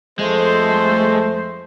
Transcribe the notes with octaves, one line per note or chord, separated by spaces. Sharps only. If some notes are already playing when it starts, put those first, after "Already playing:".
F2 G#3 A3 C5